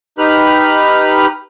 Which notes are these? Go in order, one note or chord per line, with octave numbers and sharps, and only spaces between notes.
D#4 G4 B4 B5 F6 F#6